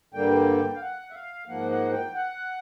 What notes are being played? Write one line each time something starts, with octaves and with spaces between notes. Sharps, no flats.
G2 D3 G3 A#3 G5
F5
F#5
E5
F5
G#2 F3 A#3 F#5
F#5
G5
F#5